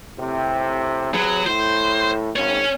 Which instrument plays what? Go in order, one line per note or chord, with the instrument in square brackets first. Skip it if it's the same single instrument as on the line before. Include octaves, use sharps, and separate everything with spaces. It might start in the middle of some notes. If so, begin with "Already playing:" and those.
[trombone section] A2 C3
[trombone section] C3 G#4 B4 [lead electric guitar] F#3
[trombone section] A2 [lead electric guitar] C5
[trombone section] G#1 [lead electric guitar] C#4 C#5